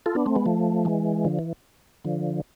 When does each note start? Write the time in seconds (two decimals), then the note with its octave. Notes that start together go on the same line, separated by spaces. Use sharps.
0.06 F4 A4
0.15 B3 D4
0.26 A3 C4
0.35 G#3 B3
0.46 F3 A3
0.85 E3 G#3
1.25 D3 F3
1.39 E3
2.05 D3 F3